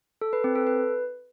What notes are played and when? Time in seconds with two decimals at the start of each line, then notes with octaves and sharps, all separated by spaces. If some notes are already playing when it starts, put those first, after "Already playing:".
0.21 A4
0.33 B4
0.44 C4
0.55 A4
0.67 B4